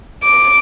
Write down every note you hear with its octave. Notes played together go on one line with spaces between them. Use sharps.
D6